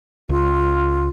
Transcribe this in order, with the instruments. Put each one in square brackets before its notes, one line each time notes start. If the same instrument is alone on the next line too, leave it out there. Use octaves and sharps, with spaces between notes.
[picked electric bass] C#2 [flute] F4